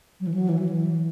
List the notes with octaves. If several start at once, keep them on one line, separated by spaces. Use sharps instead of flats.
F#3
E3
F#3
E3
F#3
E3